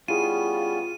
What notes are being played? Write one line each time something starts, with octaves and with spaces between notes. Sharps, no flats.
G3 B3 C#4 E4 F4 G#4 D#7